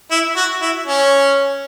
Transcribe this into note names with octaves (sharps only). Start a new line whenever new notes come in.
E4
F#4
E4
C#4